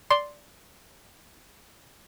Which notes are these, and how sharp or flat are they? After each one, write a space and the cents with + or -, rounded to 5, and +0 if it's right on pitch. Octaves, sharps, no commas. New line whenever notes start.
D5 -5 C6 +0